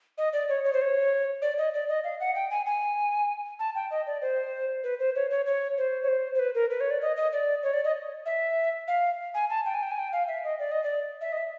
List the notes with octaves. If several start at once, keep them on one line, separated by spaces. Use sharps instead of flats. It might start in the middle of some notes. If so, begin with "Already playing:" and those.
D#5
D5
C#5
C#5
C5
C#5
D5
D#5
D5
D#5
F5
F#5
G5
G#5
G#5
A5
G5
D#5
D5
C5
B4
C5
C#5
C#5
C#5
C5
C#5
C5
C5
B4
A#4
B4
C#5
D5
D#5
D#5
D5
C#5
D5
D#5
E5
F5
G#5
A5
G5
G#5
G5
G#5
G5
F5
E5
D#5
D5
D#5
D5
E5
D#5
E5